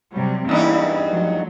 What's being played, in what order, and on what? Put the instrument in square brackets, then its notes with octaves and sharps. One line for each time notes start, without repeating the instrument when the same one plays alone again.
[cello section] C3 F#3 G3
[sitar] E2 G2 D#4 [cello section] A#3 C#4 E4
[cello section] F3 F#3 A3